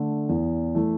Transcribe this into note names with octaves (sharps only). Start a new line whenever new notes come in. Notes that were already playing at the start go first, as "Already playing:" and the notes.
Already playing: D3 A3
E2
E3 A3